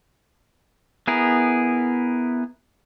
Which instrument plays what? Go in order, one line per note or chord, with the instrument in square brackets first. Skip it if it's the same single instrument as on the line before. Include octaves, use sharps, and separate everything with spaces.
[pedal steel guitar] B3 E4 G#4 A#4